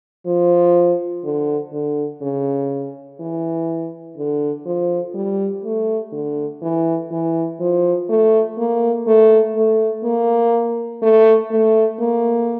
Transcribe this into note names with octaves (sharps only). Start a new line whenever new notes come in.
F3
D3
D3
C#3
E3
D3
F3
G3
A3
D3
E3
E3
F3
A3
A#3
A3
A3
A#3
A3
A3
A#3